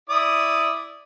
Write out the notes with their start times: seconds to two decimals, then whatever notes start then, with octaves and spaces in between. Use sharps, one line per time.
0.09 E4 D5 D#6